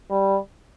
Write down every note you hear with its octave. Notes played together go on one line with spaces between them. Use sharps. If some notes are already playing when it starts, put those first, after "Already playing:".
G3